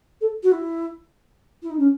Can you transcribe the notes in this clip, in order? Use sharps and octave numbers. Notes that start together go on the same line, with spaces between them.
A4
F#4
E4
E4
D#4
C#4